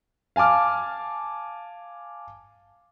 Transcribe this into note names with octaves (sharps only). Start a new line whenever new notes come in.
F5 G#5 A5 D6 F6